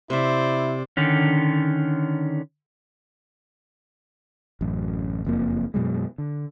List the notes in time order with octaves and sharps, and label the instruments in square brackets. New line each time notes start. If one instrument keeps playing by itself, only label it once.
[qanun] C3 E5 [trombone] E4 [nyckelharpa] C5 D5
[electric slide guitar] D3 D#3 C#4
[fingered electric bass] A1 F#2
F#1 F2 A#3
F#2 B2 F#3 G#3
D3